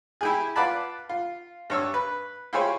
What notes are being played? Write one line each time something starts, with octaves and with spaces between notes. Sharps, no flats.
E4 G4 G#4
F4 B4 D5 F#5 A5 B5
F4
G2 C#5 E6
B4
E4 F4 G4 G#4 C5 C#5